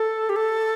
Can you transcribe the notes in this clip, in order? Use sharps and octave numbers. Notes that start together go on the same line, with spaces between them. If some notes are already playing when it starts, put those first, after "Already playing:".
Already playing: A4
G4
A4